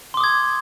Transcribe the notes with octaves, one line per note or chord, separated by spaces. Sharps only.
C6 D6 D#6 G#6